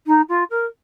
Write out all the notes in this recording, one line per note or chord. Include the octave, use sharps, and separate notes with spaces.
D#4
F4
A#4